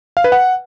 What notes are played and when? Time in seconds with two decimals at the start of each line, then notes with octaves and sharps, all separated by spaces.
0.17 F5
0.24 B4
0.32 F#5